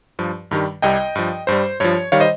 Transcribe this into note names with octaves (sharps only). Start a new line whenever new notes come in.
G2 F3
G2 D#3 G3
C2 C3 G3 D#5 G5
G2 F3
G2 G3 C5
G2 F3 C#5
D#3 G3 C#5 F5
C5 D#5